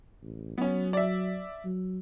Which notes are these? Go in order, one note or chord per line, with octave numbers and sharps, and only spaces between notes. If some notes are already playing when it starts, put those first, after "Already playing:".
A1
F#3 B3 C#4
D5 E5
F#3